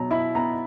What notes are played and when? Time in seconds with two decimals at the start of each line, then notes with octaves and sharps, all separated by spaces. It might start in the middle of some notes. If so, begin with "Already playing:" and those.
Already playing: B2 F#3 A#5
0.11 E4 B5
0.35 B3 A#5